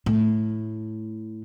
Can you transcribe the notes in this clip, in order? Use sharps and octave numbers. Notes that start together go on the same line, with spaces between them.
A2